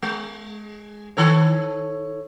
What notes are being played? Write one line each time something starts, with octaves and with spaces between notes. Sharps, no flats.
G#3
D#3 A4 C#5